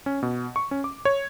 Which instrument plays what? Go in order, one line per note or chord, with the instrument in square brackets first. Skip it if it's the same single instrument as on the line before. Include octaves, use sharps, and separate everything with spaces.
[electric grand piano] C#4
B2
C#6
C#4
D6
C#5